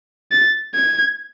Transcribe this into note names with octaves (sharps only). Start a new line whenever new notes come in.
A6
G#6